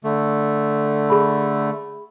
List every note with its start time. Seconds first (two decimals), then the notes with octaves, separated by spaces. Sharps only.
0.04 D3 A3
1.10 G#4 B5